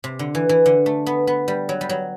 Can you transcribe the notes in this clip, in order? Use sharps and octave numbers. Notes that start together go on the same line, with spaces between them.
C3
D3
E3
E3
D3
A3
B3
B3
G3
F#3
G3
F#3